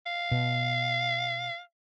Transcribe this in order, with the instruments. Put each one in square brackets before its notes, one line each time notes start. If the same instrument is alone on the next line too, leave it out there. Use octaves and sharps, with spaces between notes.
[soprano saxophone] F5
[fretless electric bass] B2